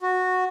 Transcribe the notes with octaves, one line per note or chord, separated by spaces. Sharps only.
F#4